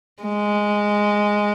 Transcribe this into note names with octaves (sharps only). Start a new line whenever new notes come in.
G#3